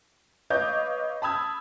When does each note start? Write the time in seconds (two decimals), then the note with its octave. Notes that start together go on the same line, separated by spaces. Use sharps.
0.50 B4 C#5 D#5 F5 D6 G6
1.22 A5 B5 D#6 E6 G#6